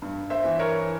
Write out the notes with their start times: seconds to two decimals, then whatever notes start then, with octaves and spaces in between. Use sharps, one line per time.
0.02 G2
0.30 C5 E5
0.44 E3
0.59 A#4 C#5